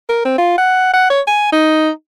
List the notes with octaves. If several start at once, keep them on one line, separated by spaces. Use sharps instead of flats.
A#4
C4
F4
F#5
F#5
C#5
G#5
D#4